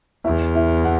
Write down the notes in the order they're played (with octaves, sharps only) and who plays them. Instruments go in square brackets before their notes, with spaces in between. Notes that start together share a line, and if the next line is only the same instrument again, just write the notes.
[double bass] E2 [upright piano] E4 E5
[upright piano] E4 E5
F#5